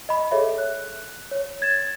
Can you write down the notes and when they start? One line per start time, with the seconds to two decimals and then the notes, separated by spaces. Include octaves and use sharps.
0.09 D#5 B5
0.31 G#4 A4 C#5 E5
0.58 F#6
1.31 C#5
1.62 G#6 A6 E7